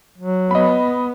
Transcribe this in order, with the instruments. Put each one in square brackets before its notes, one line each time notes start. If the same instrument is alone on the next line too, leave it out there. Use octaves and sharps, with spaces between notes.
[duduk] F#3
[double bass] B3 [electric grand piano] D#5 B5